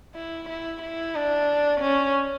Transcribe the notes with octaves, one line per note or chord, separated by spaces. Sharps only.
E4
E4
E4
D4
C#4